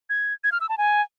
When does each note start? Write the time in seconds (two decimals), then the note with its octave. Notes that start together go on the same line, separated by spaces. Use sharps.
0.10 G#6
0.44 G#6
0.52 F6
0.61 E6
0.69 A5
0.78 G#5